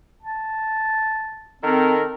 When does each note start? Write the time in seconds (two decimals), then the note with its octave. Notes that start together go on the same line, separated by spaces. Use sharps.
0.23 A5
1.63 D#3 C4 A4 A#4